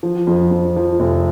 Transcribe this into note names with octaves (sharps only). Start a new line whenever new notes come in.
F3
F2
F2
F3
F1